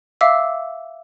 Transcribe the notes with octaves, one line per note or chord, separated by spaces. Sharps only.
E5 F5 D6 E6